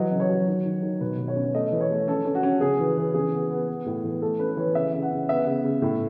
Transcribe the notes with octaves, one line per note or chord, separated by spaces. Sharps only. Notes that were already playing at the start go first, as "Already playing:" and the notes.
Already playing: E3 F#3 D#5
C#3
C#5
F#3
D#3
D#3
D#3
B2 B4
B2
C#5
C#4
A3 D#5
E3
C#5
A3
C#4 A4
C#4
F#4
C#4
C#3 G#4
E3
E3
C#3 G#4
B3
B3
B3
A2
E3
A3 A4
C#4 B4
E3 C#5
C#3 E5
C#3
F#5
C#3
B3 E5
C#3
C#3
A2